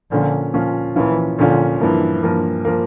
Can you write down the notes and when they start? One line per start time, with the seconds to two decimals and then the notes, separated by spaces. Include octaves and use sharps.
0.11 A#2 D3 F3 C#4 F4
0.54 A#2 F3 C#4 F4
0.96 A#2 E3 F3 C#4 F4
1.38 A#2 D3 F3 C#4 F4
1.80 G2 E3 F3 A#3
2.23 G2 F3 A#3
2.65 F3 A#3